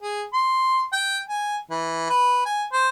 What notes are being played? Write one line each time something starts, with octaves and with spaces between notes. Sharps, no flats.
G#4
C6
G5
G#5
E3
B4
G#5
C5